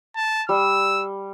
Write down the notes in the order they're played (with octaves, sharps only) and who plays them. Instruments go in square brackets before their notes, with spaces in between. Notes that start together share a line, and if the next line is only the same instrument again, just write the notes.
[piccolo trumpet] A5
[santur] G3 [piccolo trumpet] E6